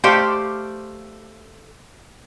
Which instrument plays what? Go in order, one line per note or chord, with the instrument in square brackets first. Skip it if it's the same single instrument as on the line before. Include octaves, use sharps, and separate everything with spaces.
[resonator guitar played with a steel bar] A3 G4 C5 D5 F5